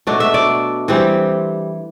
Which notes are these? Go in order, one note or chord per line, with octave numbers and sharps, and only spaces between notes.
B2 F#3 A3 D4
E5
D5
E3 G3 C4